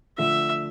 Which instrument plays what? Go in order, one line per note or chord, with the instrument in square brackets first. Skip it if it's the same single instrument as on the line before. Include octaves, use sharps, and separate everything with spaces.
[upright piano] D3 F3 A3 [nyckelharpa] E5